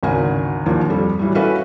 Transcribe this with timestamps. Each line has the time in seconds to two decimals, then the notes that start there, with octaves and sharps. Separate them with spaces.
0.03 G#1 D2 C#3 A#4 G#5
0.66 A#1 D#2 F4
0.89 F2 G3 A4
1.19 A2 E3 F#3 G3
1.35 C#4 F#4 A4 B4 E5 F5